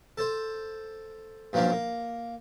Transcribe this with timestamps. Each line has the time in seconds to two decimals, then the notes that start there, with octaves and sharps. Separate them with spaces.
0.18 A4 C5
1.53 G2 F3 F#3 A#3 C#4 D4
1.72 A#3